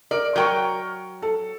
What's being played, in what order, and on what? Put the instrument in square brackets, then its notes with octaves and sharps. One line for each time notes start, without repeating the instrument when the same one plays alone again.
[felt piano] A#4 [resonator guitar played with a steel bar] D5
[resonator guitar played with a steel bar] F#3 G5 [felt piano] A#4 C#6
[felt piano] A4